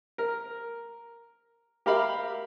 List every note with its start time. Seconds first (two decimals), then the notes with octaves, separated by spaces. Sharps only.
0.18 A#4
1.86 G4 A#4 E5 F5 B5